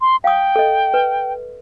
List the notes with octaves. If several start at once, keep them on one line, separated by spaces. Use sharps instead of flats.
C6
F5 G5 D#6
A4 D#5
B4